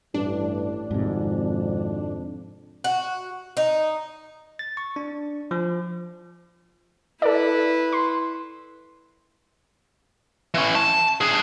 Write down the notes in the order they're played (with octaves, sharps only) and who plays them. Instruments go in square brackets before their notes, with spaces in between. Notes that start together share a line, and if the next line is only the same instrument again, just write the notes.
[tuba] A1 [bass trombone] G2 [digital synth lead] D4
[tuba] G#1 [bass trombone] F2 [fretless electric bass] G#2 C3
[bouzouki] F#4
D#4
[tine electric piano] A6
C#6
D4
F3
[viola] E4 B4 [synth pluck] A4 D5
[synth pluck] C6
[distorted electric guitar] E3 C#4
A5
D4 G#4